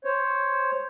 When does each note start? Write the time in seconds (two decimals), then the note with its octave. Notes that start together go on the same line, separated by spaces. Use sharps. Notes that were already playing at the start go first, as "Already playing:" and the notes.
0.05 C5 C#5